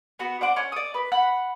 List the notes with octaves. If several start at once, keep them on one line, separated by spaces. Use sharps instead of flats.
B3 F#4
D4 C5 F#5 D6
C#4
D5 D#6
B4
F#5 B5 F#6